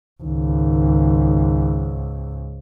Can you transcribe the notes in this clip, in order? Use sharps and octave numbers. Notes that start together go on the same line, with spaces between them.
C#2 G#2 D#3